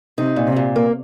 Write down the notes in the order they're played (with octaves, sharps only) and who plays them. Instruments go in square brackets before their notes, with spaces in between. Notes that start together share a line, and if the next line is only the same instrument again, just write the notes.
[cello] C3 [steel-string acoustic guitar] D#4
[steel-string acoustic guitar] A#2
[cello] C3
[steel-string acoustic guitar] A#2
A#3